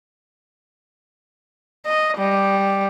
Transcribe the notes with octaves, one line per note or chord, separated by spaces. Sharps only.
D#5
G3